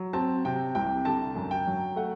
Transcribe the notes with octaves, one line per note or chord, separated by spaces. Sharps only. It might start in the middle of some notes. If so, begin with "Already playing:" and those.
Already playing: F#3
C4 A5
C3 G5
C2 G5
D3 A5
F#2
G5
F#3
A3 F#5